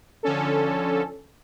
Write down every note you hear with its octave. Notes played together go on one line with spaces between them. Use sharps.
D3 F3 C#4 A4